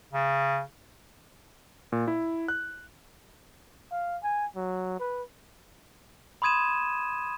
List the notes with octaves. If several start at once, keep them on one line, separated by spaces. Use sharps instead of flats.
C#3
A#2
E4
F#6
F5
G#5
F#3
B4
B5 C6 D#6 G#6 D#7 E7